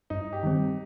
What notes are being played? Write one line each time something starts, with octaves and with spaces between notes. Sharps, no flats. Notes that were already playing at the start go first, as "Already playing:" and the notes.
G2 D#4
G4
D#3 G3 C4